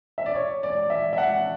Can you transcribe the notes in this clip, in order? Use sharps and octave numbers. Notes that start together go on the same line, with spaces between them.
E5
D5
C#5
D5
E5
E5
F#5